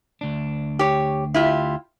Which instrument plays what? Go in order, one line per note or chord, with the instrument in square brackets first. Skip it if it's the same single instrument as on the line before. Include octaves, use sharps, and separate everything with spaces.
[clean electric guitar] D2 D4
[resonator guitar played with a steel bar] G4 C#5
E4 F4 G4